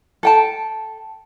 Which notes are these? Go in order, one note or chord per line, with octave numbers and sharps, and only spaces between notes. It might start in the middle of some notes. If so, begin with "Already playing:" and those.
A4 G5 A5